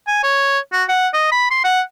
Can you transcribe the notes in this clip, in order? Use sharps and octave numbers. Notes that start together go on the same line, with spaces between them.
G#5
C#5
F#4
F#5
D#5
B5
C6
F#5